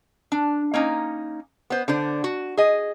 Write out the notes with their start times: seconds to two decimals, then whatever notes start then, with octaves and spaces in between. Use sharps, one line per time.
0.32 D4
0.74 A#3 C#4 D#4
1.70 B3 C5
1.88 D3 D4 C5
2.24 F#4
2.57 G#4 D#5